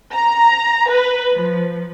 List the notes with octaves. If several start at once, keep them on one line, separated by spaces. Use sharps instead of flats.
A#5
B4
F3